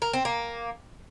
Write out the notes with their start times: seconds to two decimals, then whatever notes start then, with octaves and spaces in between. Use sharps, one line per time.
0.02 A#4
0.13 C4
0.25 A#3